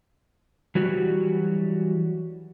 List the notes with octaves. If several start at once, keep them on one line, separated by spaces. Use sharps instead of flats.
E3 F#3 G3 F#4